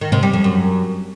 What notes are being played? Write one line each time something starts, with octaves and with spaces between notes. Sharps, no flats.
D#3
C3
G3
F2
F#2